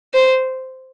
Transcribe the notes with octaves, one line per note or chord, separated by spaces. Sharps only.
C5